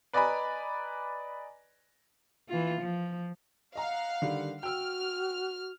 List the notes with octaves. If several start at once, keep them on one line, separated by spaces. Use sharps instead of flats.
B4 D5 D#5 G#5 A#5 B5
E3 F4
F3
D#5 F5 F#5 A#5
D3 D#3 G3
F#4 G5 E6 F6